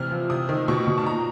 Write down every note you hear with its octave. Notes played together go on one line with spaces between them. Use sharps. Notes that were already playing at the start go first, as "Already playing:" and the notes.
Already playing: C3 E3 F6
F3
C3 D#6
D#3
B2 C#6
B2
A5
A#2 A#5